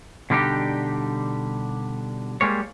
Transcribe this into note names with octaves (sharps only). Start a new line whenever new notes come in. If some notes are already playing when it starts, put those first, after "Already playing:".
B2 D3 G3 D4 D#4 G4
G3 G#3 A#3 C#5